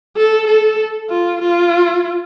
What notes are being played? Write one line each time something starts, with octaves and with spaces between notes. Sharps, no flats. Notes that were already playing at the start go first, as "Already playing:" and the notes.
A4
A4
F4
F4